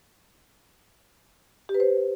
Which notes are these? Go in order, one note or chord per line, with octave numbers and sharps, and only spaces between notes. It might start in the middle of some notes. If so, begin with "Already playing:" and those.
G4
B4
C5